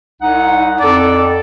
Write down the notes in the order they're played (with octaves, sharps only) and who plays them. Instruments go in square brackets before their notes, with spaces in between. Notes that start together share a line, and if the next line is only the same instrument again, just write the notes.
[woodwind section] C2 D#4 F#5
[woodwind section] F2 [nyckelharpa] A4 [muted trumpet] D5